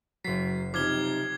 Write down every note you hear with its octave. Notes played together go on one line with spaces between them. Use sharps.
F#1 F#3 B6 C7
C3 F3 D#4 D6 F6 G#6 G7